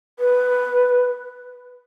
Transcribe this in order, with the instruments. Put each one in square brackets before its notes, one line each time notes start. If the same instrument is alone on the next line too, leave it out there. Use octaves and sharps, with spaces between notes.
[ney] B4